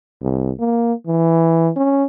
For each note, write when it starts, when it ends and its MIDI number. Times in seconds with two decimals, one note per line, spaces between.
0.21 0.52 36
0.59 0.93 58
1.07 1.70 52
1.76 2.04 61